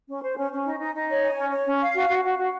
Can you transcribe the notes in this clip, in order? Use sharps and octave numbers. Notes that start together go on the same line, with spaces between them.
C#4
C5
C#4
C#4
D#4
D#4
D#4
C#5
G#5
C#4
C#5
C#4
F5
F#4
F#4
F#4
F#4